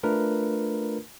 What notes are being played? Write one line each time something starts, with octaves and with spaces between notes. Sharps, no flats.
A3 D4 F4 A#4 B4